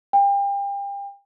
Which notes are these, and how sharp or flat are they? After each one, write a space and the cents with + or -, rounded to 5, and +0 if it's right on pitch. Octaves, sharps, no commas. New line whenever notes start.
G5 +35